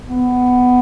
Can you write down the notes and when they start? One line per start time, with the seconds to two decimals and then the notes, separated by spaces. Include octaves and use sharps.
0.07 B3